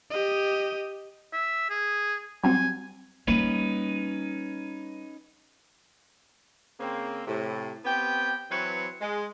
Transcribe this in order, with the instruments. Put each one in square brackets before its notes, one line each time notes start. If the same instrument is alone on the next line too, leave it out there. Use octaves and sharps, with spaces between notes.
[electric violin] G4 D#5
[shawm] E5
G#4
[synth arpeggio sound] F#3 G3 C4 [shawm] G#5
[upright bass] G3 A#3 [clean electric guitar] C#4 D#4 B4
[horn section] C#3 A#3 C4
A2 C3
B3 C4 G4 G5
E3 F#3 C4 B4 C#5
G#3